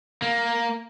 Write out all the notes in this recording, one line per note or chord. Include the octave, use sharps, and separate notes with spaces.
A#3